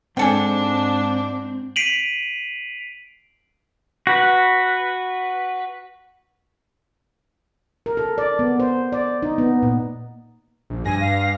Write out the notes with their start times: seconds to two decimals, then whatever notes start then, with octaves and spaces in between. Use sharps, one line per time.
0.17 G#2 C4 D4 G#4 A4 G5
1.76 B6 C7 D7 D#7 F7 F#7
4.07 F#4 B4
7.86 A#4
7.97 A4
8.18 D5
8.39 B3
8.60 C5
8.92 D5
9.23 D#4
9.38 B3
9.63 A#2
10.70 A#1
10.85 G2 G#5 A#6
11.01 F5